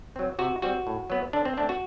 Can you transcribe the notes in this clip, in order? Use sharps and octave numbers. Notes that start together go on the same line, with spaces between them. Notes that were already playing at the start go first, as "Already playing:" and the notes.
F#3 C4
C3 F#4
G3 C4 F#4
A2
F#3 B3
D3 D4
C4
A3 C4 D4
F#4